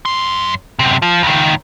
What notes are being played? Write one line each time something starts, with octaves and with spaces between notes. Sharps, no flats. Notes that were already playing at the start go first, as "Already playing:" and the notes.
F#2 C6
F#2 C3
F3
C#2 D#3